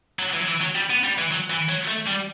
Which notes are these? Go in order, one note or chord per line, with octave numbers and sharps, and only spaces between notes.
F#3
E3
F#3
E3
F#3
G3
B3
G3
E3
F#3
E3
F#3
A3
G3